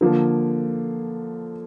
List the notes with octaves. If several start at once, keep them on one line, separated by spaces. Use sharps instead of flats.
D3 F3 A#3